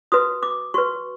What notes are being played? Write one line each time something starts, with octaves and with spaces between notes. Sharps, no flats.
F#4 B4 D#6
D6
F#4 B4 C#6